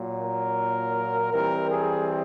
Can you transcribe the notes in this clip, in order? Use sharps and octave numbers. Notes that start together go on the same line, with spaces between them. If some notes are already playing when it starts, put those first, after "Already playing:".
Already playing: A#2 F#3 A#3
A#4
E3 G3 C4 A#4
G#4